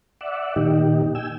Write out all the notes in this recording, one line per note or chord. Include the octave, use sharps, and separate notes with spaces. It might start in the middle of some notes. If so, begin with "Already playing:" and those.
D5 E5 F#5
A#2 D#3 D#4 G4
G5 G#5 E6